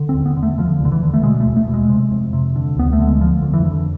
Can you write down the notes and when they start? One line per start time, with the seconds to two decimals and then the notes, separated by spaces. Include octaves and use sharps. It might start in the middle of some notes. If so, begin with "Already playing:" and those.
Already playing: D3
0.09 C4
0.15 E2
0.26 B3
0.37 D3
0.43 A3
0.58 D3 F3
0.80 E2 D3
0.92 E3
1.03 D3
1.14 A3
1.23 B2 G#3
1.40 A3
1.46 E2
1.56 A3
1.68 B2
1.74 G#3
1.90 C3
2.11 F2
2.33 C3
2.56 D3
2.76 D2 B3
2.93 A3
2.99 D3
3.07 G#3
3.21 D3 F3
3.42 F2
3.54 E3
3.64 D3